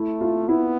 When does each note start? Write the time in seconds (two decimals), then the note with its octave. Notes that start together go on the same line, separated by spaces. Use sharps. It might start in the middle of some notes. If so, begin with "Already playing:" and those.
Already playing: A3 E4
0.21 F4
0.49 B3 E4